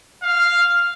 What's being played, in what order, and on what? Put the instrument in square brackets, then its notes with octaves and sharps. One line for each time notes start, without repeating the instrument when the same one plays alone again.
[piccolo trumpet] F5